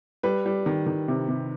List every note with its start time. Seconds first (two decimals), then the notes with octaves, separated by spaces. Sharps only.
0.23 G3 B4
0.46 G3
0.66 D#3
0.86 D#3
1.08 C3
1.29 C3